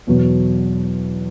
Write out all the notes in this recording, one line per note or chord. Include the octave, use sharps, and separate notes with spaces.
E2 B2 F#3